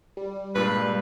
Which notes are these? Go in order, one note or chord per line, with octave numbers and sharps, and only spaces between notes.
G3
G2 A#2 G#3 B4